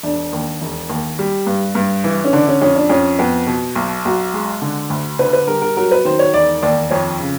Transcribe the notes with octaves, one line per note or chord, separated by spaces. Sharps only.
E1 D4
D#2
E1
D#2
G3
G2
G2
E3
C#4
D3 D4
C#4
F2 C#4
D4
F2 C#4
F2 B3
B2
B1
B1 F#4
G#3
D3
D2
D3 B4
B4
G3 A#4
A#4
F#3 A#4
B4
D#3 C5
C#5
E1 D5
D#2 D5
F2 C#5
C#3